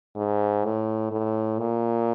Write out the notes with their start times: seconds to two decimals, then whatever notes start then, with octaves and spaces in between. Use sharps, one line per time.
0.16 G#2
0.65 A2
1.12 A2
1.59 A#2